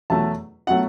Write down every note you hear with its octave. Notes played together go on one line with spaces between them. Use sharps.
E2 B2 F#3 A3 A5
B2 F#3 A3 F#5